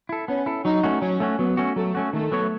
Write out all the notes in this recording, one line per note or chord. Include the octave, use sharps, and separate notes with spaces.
E4 A4
B3 C#4
E4 A4
F#3 D#4
A3 C#4 F#4
F#3 C#4
A3 C#4 F#4
F#3 B3
A3 C#4 F#4
F#3 A3
A3 C#4 F#4
D#3 A3
F#3 B3 F#4 C#5